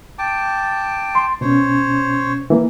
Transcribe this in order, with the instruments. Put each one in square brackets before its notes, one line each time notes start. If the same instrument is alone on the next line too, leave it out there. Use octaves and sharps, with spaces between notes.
[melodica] G5 A5 D6
[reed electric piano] C6
[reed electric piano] B2 C#4 [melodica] C5 C#5
[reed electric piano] E3 A#3